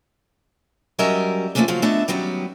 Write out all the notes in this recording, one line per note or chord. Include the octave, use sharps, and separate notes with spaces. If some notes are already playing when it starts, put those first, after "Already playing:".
F#3 G3 C#4 A#4 D#5 E5
F3 F#3 A3 A#3 C#4 D4
C#3 F3 F#3 F5
A3 B3 D4 D#5 E5
D#3 F#3 G3 B3 C#4